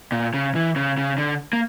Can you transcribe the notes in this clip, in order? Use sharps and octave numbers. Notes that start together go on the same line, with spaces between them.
A#2
C#3
E3
C#3
C#3
D3
A#3